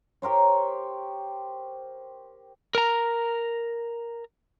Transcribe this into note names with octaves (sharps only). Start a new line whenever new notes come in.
G4 A#4 C5 C#5
A#4 A#5